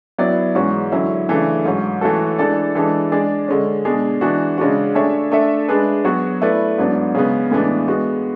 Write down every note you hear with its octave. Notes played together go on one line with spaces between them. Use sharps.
F#3 B3 E4 B4 D5
G#2 E3 G#3 C#4 F#4
D3 F#3 C#4 E4
C#3 E3 A3 D4
G#2 F#3 C#4
E3 A3 C#4 F#4 A4
E3 G#3 D4 A4 D5
E3 G#3 D4 A4
G#3 D4 G#4 D5
D3 G#3 C#4
B2 G#3 D4 G#4
E3 G#3 D4 F#4
C#3 G#3 D4 F#4
A3 D4 G#4 C#5 E5
A3 D4 A4 E5
G#3 D4 G#4 B4
F#3 B3 F#4 C#5
A3 E4 B4 D5
G#2 F#3 B3 D4
C#3 G#3 B3
A2 E3 G#3 B3 D4
G#3 B3 F#4